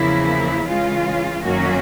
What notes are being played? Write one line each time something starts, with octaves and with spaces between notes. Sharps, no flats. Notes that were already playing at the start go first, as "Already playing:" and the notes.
Already playing: E2 C#3 F3 A#3 E4
C#3 E3 G#3 C#4 F4
F#2 D#3 F#3 A#3 C#4 F#4